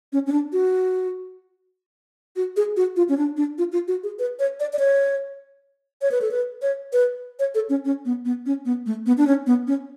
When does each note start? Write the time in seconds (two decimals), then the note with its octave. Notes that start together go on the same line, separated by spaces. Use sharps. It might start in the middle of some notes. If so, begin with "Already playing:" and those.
0.13 C#4
0.27 C#4
0.32 D4
0.53 F#4
2.36 F#4
2.57 G#4
2.77 F#4
2.96 F4
3.09 C#4
3.18 D4
3.37 D4
3.58 F4
3.72 F4
3.88 F#4
4.03 G#4
4.19 B4
4.39 C#5
4.60 D5
4.73 D5
4.79 C#5
6.02 C#5
6.11 B4
6.22 A4
6.31 B4
6.62 C#5
6.93 B4
7.39 C#5
7.55 A4
7.70 C#4
7.85 C#4
8.05 B3
8.25 B3
8.46 C#4
8.65 B3
8.86 A3
9.06 B3
9.18 D4
9.27 C#4
9.47 B3
9.67 C#4